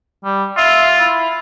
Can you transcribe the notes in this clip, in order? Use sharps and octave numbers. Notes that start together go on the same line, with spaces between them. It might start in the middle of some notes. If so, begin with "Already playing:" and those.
G3
F4 E5
E4